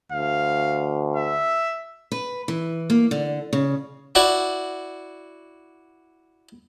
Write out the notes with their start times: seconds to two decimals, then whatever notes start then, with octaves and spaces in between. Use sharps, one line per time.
0.12 D2 F5
1.16 E5
2.12 B4
2.48 E3
2.90 A#3
3.11 D3
3.53 C#3
4.15 E4 F#4 D5 F#5